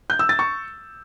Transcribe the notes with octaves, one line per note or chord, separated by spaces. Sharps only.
G6
E6
A6
C#6